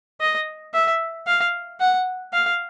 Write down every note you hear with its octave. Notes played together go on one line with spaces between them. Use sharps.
D#5
E5
F5
F#5
F5